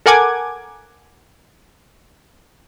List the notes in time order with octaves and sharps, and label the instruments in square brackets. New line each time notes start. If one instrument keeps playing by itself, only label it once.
[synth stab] A4 A#4 F#5 G#5 D6 G#6